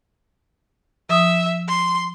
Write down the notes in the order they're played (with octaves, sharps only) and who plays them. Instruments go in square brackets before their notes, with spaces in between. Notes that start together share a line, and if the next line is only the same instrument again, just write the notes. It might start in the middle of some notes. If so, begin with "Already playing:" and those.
[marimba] F3 D#6 [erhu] E5
[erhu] C6